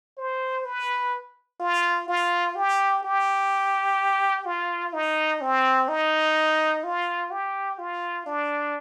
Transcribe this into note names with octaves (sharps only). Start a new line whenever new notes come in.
C5
B4
F4
F4
G4
G4
F4
D#4
C4
D#4
F4
G4
F4
D4